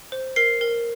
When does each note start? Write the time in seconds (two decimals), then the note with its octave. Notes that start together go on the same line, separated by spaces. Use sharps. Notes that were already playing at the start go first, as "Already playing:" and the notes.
0.12 C5
0.36 A#4 C7
0.61 A#4